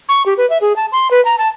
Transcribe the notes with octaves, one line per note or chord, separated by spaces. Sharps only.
C#6
G4
B4
E5
G#4
A5
C6
B4
A#5
A5